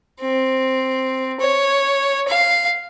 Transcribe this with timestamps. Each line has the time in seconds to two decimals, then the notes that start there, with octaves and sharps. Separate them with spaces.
0.20 C4
1.40 C#5
2.28 F5